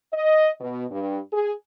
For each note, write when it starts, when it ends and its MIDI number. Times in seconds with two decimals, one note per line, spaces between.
0.13 0.51 75
0.60 0.85 47
0.91 1.18 43
1.32 1.52 68